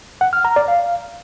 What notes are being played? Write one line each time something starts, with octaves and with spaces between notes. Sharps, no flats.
F#5
F6
A#5
D5
F5